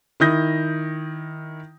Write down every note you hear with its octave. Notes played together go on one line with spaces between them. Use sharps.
D#3 E4 D#6 G6 A#6